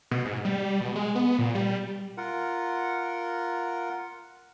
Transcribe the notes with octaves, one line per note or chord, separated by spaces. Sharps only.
B2
G#2
G3
B2
G#3
B3
A#2
G3
F4 A#4 F#5